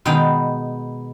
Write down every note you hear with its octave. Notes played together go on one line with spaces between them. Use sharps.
B2 D#3 G#3 B3 F5 G5